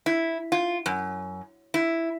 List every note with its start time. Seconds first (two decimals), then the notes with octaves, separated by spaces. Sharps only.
0.06 E4
0.52 F4
0.86 F#2
1.74 E4